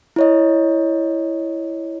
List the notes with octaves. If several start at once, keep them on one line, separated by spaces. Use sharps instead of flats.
E4 C#5 D#5